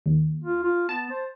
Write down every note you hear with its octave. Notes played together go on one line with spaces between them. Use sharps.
D#2
F4
F4
B3 A5
C5